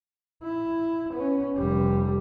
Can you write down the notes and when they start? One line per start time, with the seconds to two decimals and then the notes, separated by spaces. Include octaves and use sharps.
0.43 E4
1.13 B3 C#4
1.56 F1 G3